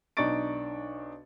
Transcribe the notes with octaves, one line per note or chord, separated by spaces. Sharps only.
B1 D4 D#4 C#6 A6 D7